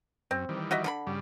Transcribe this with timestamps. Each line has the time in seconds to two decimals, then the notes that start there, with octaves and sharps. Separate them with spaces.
0.31 F#2 C4
0.49 D#3 E3 G3
0.71 F#4 D#5 E5
0.84 D3 A3 B5
1.07 G2 C#3 G3